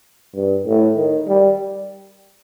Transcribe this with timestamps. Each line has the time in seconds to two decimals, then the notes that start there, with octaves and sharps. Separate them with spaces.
0.35 G2
0.67 A2
0.96 D#3
1.28 G3